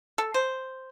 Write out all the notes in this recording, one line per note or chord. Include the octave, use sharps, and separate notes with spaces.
A4
C5